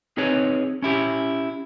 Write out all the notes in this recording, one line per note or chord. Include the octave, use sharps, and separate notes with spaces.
C4 D#4 G#4 B4 C#5
C#4 E4 G4